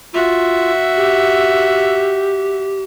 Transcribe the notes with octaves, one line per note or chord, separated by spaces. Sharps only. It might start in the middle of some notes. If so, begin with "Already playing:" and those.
F4 F#4 E5
G4